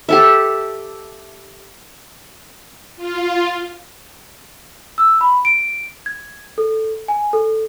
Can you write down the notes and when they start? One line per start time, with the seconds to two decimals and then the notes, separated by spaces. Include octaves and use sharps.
0.09 G4 A4 E5
2.96 F4
4.98 E6
5.21 B5
5.45 D7
6.06 G#6
6.58 A4
7.08 G#5
7.33 A4